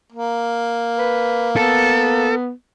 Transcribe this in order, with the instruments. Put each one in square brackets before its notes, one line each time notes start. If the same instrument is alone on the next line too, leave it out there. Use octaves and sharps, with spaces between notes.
[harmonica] A#3
[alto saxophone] B4
[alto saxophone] B3 [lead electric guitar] A4